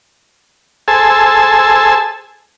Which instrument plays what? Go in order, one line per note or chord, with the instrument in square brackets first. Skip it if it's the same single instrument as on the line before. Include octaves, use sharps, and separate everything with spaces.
[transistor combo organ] G#4 A4 C5 G#5 A5 E6